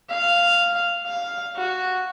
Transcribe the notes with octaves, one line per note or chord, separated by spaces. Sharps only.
F5
F5
F#4